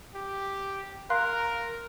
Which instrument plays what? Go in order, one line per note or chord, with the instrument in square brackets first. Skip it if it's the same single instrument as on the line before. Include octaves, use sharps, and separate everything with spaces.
[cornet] G4
[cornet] A#4 [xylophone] F5 C6 F#6